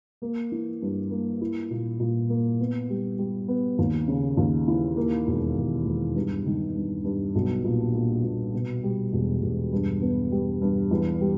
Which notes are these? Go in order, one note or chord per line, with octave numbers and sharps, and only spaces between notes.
A#3
E3
G2
A#3
E4
A#2
A#2
A#3
B3
G3
G3
B3
D#2
C#3
D#2
E3
A#3
E1
E1
E1
G2
D#3
G2
G2
B1
A#2
A#2
A#2
B2
G3
E1
E1
G2
B3
G3
G2
E2
G3